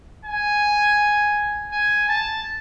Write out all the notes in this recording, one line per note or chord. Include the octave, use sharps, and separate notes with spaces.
G#5
G#5
A5